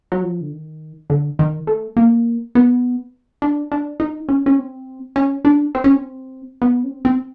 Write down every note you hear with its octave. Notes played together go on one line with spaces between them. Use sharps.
F#3
F3
D3
D#3
D3
D#3
A3
A#3
B3
D4
D4
D#4
C#4
C#4
C4
C#4
D4
C4
C#4
C4
B3
C#4
C4
C4